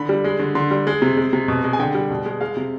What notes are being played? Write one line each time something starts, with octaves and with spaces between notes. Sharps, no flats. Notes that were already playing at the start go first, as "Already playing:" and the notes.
Already playing: D3 B5
G3
G#3
D3
D3 C6
G3
G#3
C3
G#3
C3
B2
G#3
G#5
D3 G5
G3
B2
G#3
G#3 F5
C3